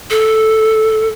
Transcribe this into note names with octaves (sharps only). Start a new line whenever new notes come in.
A4